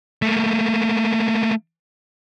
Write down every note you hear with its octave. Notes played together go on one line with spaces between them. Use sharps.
A3 A#3